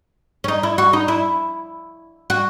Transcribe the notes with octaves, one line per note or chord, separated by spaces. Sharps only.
C#4
D#4
E4
F#4
D#4
E4
F#4